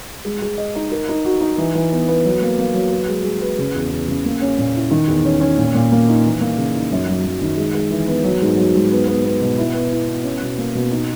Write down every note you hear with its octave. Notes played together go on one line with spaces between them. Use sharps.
G#3
G#3
D#5
D#4
A#4
D#4
F#4
D#4
E3
E3
B3
B3
F#3
A#3
A#3
F#3
B4
G#3
G#3
B4
C#3
E2
E2
C#3
A#3
C#4
A#2
E4
D#3
E2
C#4
C#4
A#2
A#2
A#3
D#4
E3
A#3
C#3
D#4
F#2
F#3
F#3
D#3
G#3
G#3
E3
B3
F#3
G#2
F#3
G#2
B3
B3
B3
B2
E4
B3
E4
B3
C#4
B2
A#3
B2
D#4